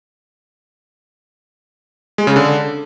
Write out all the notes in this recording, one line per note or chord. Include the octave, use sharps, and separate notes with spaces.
G#3
C#3
D3